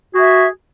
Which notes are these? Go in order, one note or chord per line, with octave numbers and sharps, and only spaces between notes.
F#4 G#4 E5